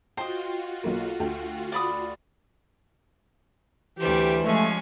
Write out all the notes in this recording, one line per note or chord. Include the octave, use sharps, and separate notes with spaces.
F4 F#4 C5 D#5 G5
B1 A#3
D2 G5
D5 B5 D#6
D2 E3 G3 G4 C5
F3 G#3 A3 C#4 G#5